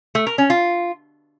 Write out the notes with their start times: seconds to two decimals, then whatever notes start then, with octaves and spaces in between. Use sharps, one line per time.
0.15 A3
0.27 A#4
0.38 C#4
0.50 F4